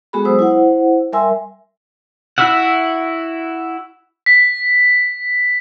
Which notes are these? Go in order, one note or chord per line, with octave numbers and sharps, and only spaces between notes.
G#3 B3 F#4 G#4 A4 B5
F#3 C5 D#6 E6
E4 C5 F#5
G3 A#4 E5 G#5 C6 E6
E4 F#4 E5 F#5
B6